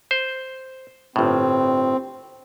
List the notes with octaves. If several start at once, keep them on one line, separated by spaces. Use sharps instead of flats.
C5
G1 A2 C4